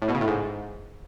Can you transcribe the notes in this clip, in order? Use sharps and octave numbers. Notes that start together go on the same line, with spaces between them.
A2
B2
C#3
A2
G#2